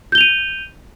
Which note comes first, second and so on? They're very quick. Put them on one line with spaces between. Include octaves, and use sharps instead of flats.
G6 G7 F7 D#7